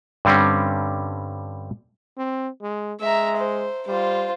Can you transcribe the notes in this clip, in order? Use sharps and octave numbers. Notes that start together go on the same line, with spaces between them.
G2 D3 G3 C4 C#4
C4
G#3
G#3 E5 A#5
C5
G3 F4 C5